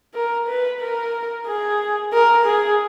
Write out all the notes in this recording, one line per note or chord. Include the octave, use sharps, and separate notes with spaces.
A#4
B4
A#4
G#4
A#4
G#4